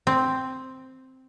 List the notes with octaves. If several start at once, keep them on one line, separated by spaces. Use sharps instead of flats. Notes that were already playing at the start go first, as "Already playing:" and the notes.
C4